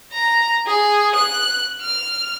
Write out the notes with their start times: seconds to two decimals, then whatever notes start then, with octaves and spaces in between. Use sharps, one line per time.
0.13 A#5
0.67 G#4
1.15 F#6
1.82 F6